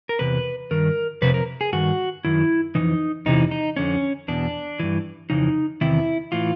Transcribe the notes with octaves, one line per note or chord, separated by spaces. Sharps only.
A#4
E2 C3 B4
G2 D#3 A#4
F2 C3 B4
A#4
G#4
G2 D#3 F#4
F#2 D#3 E4
F2 C#3 E3 D#4
E2 C3 E3 D#4
D#4
F2 D3 C#4
E2 B2 D4
G2 E3
F2 C#3 E3 D#4
E2 C3 D#3 E4
A2 E3 F4